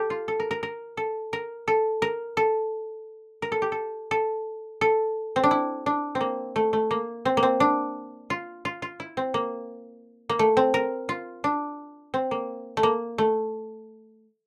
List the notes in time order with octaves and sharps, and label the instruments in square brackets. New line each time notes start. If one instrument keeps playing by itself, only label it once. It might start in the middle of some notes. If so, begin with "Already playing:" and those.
Already playing: [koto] G4 A4
F4
A4
A#4
A#4
A#4
A4
A#4
A4
A#4
A4
A#4
A4
G4
A4
A4
A4
C4
D4
E4
D4
C4
A#3
A3
A3
A#3
C4
A#3
C4
D4
F4
F4
F4
E4
C4
A#3
A#3
A3
C4
A#4
F4
D4
C4
A#3
A3
A#3
A3